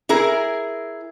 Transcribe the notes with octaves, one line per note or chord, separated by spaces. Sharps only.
E4 G#4 A#4